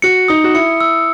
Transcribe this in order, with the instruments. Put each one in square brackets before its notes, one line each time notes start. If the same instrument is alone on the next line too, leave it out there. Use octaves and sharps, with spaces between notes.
[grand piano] F#4 [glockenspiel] C#7
[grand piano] D#4 [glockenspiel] D#6
[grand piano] F#4
[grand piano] E4 [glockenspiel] C#7
[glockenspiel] E6